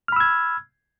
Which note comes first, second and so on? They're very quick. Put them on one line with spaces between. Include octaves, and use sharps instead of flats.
F6 B5 E6 G#6